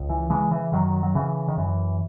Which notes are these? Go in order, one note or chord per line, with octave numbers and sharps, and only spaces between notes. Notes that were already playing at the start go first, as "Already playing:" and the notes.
Already playing: C#2
E3
C#3 E3 G#3
E3
F#2 D#3 F#3
F#3
C#3 E3
D#3
F#2 E3